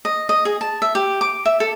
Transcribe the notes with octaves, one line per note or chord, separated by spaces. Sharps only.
D#5
D#5
G#4
A5
E5
G4
D6
E5
A4